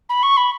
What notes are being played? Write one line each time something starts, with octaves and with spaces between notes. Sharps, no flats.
B5
C#6
B5